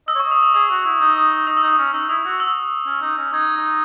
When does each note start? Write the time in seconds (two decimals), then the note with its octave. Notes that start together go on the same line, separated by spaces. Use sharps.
0.08 D#5 E6
0.15 C#5
0.20 D#5 C#6
0.31 D#6
0.43 D#6
0.54 G#4 D#6
0.71 F#4
0.86 E4
1.01 D#4
1.47 D#4 D#6
1.57 E6
1.63 D#4 D#6
1.78 C#4
1.94 D#4 E6
2.09 E4 D#6
2.25 F#4
2.40 E6
2.87 C#4
3.02 D#4
3.18 C#4
3.33 D#4 G#6
3.57 D#4